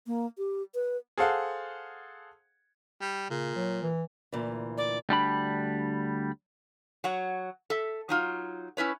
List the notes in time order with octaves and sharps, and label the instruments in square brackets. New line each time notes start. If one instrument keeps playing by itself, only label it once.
[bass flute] A#3
G4
B4
[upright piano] G#4 A4 C5 F5 F#5
[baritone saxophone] G3
[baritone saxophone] A#2 [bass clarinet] C#3
[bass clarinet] F#3
E3
[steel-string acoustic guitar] D2 A#2 E3
[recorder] D5
[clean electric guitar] D2 G3 D4 B5
[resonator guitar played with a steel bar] F#3 C#5 F#5
A4 E5
F#3 D#4 F4
C#4 E4 B4 C#5